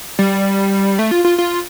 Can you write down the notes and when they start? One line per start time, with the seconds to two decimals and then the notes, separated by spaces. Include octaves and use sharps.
0.19 G3
0.99 A3
1.11 F4
1.25 F4
1.38 F4